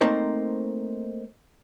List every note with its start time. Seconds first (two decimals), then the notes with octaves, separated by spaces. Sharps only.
0.01 A3 A#3 C4 D#4 C5